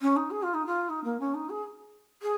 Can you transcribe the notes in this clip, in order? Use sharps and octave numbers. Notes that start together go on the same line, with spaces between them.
C#4
D#4
G#4
F4
D#4
F4
D#4
A#3
C#4
D#4
G#4
G#4